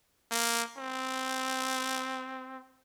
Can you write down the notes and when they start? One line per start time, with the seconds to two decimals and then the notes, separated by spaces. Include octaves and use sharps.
0.31 A#3
0.77 C4